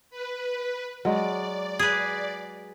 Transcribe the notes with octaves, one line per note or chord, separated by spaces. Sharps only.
B4
F#3 G#3 D5
G#4 B4